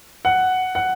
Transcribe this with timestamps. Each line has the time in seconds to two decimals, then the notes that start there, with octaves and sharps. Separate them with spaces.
0.25 F#5
0.75 F#5